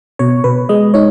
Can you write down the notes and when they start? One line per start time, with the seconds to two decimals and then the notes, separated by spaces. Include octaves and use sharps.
0.19 B2 C#5
0.44 B2 B4
0.69 G#3 D#5
0.94 D#4 C#5